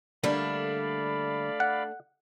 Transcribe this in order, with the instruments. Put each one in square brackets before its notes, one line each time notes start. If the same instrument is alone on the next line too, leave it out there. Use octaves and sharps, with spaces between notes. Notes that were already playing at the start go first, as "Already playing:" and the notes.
[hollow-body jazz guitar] D3 G3 A#3 [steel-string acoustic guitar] A3 D4 [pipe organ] D5 F5 B5
[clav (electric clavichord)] F#5